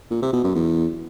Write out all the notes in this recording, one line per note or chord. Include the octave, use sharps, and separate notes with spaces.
A#2
C3
B2
F#2
E2